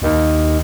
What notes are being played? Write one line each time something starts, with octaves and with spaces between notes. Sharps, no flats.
D#2